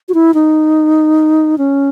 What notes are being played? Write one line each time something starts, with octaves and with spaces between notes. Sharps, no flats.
F#4
E4
D#4
C#4